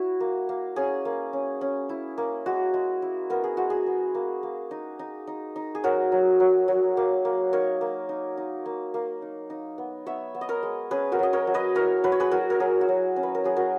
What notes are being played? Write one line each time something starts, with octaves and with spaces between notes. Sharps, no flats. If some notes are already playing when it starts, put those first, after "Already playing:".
Already playing: E4 F#4 C#5
A#3
A#3
C#4 G#4
A#3
C#4
C#4
E4
A#3
G#3 F#4
G#3
E4
B3 A#4
G#4
G#3 F#4
G#4
B3
A#3
A#3
D#4
D#4
D#4
D#4
G#4
F#3 F#4 A#4
F#3
F#3
F#3
A#3
A#3
D#4 A#4 C#5
A#3
D#4
D#4
A#3
A#3
D#4
D#4
B3
B3 C#5 E5
B3
D#5
A#4 C#5
G#3
C#4 G#4 B4
F#4 A#4
F#3 D#5
A#4 C#5
F#3
B4 D#5
E4 A#4 C#5
F#3 B4
C#5
G#4 B4
E4 F#4 A#4
A#4
F#3 G#4
F#4
F#3
C#4
B4
A#4
F#3 G#4
F#4 A#4